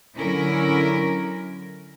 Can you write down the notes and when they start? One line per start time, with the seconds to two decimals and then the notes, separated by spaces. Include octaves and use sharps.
0.16 D3 F#3 C#4 E4 A#4